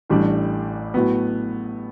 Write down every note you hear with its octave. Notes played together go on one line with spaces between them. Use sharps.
A1 A2 G3 D4
A2 F#3 B3